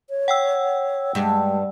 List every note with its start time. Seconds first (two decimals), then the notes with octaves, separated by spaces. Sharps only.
0.10 C#5
0.28 F#5 G5 E6
1.15 G2 G#3